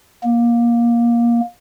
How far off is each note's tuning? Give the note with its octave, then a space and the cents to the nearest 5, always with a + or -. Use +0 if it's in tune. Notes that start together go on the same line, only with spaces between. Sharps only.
A#3 +20